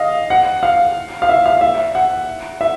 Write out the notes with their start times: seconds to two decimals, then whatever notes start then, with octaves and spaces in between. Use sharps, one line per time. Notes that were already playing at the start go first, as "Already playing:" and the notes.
Already playing: D#5 F5
0.30 F#5
0.63 F5
1.22 F5
1.29 E5
1.46 F5
1.61 E5
1.95 F#5
2.61 E5